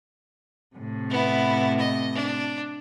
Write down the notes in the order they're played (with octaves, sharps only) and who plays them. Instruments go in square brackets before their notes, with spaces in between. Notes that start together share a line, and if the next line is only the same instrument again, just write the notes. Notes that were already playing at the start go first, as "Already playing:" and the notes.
[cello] A2 C3
[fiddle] B3 E4
D#5
D4